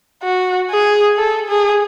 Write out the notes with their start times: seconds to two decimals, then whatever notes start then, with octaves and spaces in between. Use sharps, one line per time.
0.23 F#4
0.70 G#4
1.17 A4
1.48 G#4